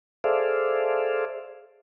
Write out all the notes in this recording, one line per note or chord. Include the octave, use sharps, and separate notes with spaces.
G#4 A4 C5 D5 E5 F5